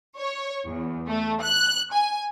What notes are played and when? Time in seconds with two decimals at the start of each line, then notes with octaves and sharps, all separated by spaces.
0.18 C#5
0.65 E2
1.07 A3
1.41 F#6
1.92 G#5